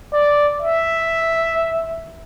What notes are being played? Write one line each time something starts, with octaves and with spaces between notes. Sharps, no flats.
D5
E5